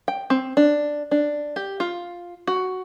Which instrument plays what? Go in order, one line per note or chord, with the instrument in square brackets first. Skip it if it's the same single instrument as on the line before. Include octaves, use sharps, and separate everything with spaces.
[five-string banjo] G5
C4
D4
D4
G4
F4
F#4